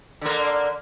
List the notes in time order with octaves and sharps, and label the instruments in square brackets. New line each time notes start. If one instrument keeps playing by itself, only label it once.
[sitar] D3 A#3